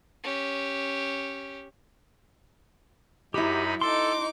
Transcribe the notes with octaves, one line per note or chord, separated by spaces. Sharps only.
C#4 G4
F#2 D#4 E4 F#4 G4 B5
D#4 A4 C6 D6